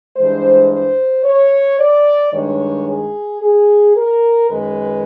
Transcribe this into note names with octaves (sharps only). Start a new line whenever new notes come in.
G2 E3 G#3 C5
C5
C#5
D5
G2 D#3 G#3 C#5
G#4
G#4
A#4
F#2 D#3 G#3 B4